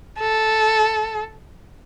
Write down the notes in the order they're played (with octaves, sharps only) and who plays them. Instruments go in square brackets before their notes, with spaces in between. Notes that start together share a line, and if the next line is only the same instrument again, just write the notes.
[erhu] A4